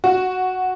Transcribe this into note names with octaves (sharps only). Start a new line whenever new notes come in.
F#4